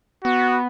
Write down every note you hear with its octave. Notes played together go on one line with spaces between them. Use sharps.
B3 F#4